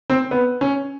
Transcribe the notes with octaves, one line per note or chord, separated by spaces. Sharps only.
C4
B3
C#4